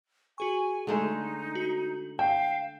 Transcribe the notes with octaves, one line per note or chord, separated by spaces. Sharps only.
F#4 G#4 G#5 C#6
D3 G#3 A3 D#4
F#4
F5 G5 E7